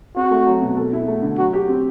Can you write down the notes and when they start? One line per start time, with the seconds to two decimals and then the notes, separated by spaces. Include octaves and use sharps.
0.16 C4 F#4
0.31 A3
0.46 F#3
0.62 B2
0.76 A4
0.93 E4
1.08 A3
1.22 D3
1.38 F#3 F#4
1.53 G4
1.68 C4